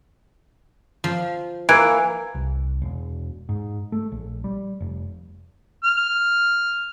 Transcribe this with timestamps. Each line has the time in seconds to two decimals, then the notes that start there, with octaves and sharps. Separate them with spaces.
1.04 F3
1.69 E3 A#3 F#6 G#6 D7
2.35 C2
2.82 E1
3.49 G#2
3.92 A3
4.12 A#1
4.44 G3
4.80 F1
5.84 F6